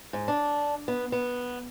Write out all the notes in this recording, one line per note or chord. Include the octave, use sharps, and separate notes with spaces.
G#2
D4
B3
B3